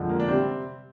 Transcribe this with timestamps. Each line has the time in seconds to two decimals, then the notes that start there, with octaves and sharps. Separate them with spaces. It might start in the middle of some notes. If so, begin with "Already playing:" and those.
Already playing: F2 D3 F3 G#3
0.09 A#3
0.20 D4
0.28 C3 G3 C4